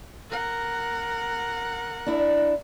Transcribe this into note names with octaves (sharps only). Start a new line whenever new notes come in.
A#4 F#5
D4 E4